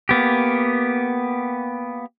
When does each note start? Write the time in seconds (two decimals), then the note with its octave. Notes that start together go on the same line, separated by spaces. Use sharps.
0.09 A#3 B3 G4